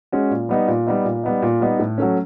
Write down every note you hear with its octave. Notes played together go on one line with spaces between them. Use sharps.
G#3 C#4 F#4
A#2
G3 B3 D#4
A#2
G3 B3 D#4
A#2
G3 B3 D#4
A#2
G3 B3 D#4
A2
F#3 A3 C#4